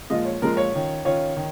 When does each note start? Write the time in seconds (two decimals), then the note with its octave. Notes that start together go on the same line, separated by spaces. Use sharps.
0.10 A#2 F3 G#3 F4 D#5
0.25 C#5
0.42 A#2 F3 G#3 F4 A#4
0.57 C#5
0.73 D#3 C#4 F4
1.05 D#3 C#4 F4 C#5
1.37 D#3